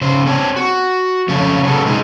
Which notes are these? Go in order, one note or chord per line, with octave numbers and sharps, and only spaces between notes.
C#3 C5
C4 D4 C#5
F#4
F2 C#3 A3 C#5
C#3 F3 F#3 B3 A4
B2 G#3 D#4